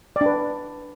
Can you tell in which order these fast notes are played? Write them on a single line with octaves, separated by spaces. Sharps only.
D5 D4 B4